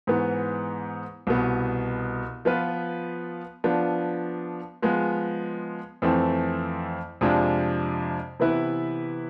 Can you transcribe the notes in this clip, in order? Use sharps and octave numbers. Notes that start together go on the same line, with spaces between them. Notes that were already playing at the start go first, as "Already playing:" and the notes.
G#2 E3 B3
C2 B2 B3
F3 B3 F4 B4
F3 B3 D4
F3 G#3 B3
F2 E3 A3 C4
F2 C3 F3 G#3 D4
C3 E3 B3 E4 B4